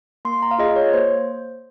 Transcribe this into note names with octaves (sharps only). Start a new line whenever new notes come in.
A#3 C6
A#5
F5
F4 G#4 D#5
C#5
A#3 C5